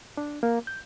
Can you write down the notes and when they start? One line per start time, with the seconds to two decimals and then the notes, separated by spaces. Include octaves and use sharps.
0.17 D4
0.43 A#3
0.67 G6